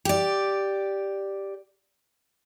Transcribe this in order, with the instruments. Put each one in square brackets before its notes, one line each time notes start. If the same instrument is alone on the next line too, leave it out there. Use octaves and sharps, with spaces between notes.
[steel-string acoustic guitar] G4 D5